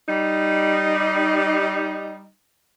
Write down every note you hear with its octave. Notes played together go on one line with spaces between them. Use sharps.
G3 D#4